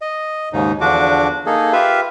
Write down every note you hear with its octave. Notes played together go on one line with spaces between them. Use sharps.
D#5
D#2 G#2 C#3 D#4
E2 D3 F3 D4 F#4 D6
A#3 D#4 G#4 A4
F4 G4 B4 E5 F5